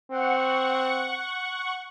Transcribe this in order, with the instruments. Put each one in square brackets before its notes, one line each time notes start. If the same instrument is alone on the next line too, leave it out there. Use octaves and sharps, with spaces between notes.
[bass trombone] C4 [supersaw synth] F#5 C#6